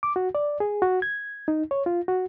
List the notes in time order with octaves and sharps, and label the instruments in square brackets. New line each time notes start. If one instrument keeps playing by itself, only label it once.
[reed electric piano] D6
F#4
D5
G#4
F#4
G#6
D#4
C#5
F4
F#4